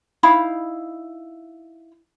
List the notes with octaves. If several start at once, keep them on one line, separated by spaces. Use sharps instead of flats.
D#4 E4 F5 B5